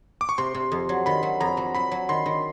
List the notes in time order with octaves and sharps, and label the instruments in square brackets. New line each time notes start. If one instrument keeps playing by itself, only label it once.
[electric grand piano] D6
C#6
[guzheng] C3 [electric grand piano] C6
[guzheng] C3
F2
F#3
[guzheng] D#3 [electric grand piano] B5
[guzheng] F#3
[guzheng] F2 [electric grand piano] A#5
[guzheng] F#3
[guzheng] F#3 [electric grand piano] B5
[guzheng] F#3
[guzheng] D#3 [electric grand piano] C6
[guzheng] D#3